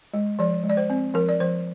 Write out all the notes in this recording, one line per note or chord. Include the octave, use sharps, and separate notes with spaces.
G#3
F3 D5
G#3
D5
C5
C4
F3 A#4
D5
F3 C5